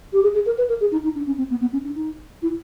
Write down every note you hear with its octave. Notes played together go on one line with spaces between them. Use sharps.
G4
G#4
G#4
A#4
B4
A#4
G#4
D#4
D#4
D4
C#4
C4
B3
B3
C#4
D4
D#4
E4